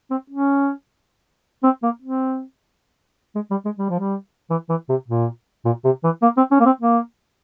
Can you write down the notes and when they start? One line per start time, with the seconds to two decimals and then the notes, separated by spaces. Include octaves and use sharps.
0.10 C4
0.30 C#4
1.64 C4
1.83 A#3
2.02 C4
3.35 G#3
3.51 G3
3.65 G#3
3.78 G3
3.89 F3
3.99 G3
4.50 E3
4.69 E3
4.89 C3
5.08 A#2
5.65 A#2
5.84 C3
6.04 E3
6.22 A#3
6.37 C4
6.51 C#4
6.60 A#3
6.66 C4
6.80 A#3